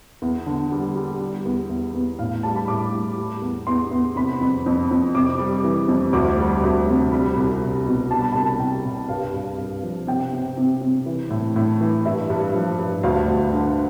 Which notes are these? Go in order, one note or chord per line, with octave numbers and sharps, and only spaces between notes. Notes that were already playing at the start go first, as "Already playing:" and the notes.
E2
D3
G3
G3
G3
E2
E2
E2
A2 F5
G3 A5
B5
A2 D6
A2
G3
E2
E2 C6
E2
C3 B5
F2
F2
F2
C3 D6
G3
E3
F2
D2 D6
G3
D2
C3
G3 B5
C2
C2
B2
G3 A5
B5
C2 A5
C2 G5
C2
G2 F5
G2
G2
F3
C3 G5
C3
C3
C3
E3
A2
A2
E3
G2 E5
G2
F3
G2
D2 F5
D2
D3